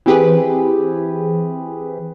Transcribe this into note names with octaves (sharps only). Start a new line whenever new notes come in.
E3 C4 G4 G#4 B4